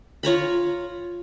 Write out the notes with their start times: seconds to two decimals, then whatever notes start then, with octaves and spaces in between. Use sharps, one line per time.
0.23 F4 C#5 A#5 B5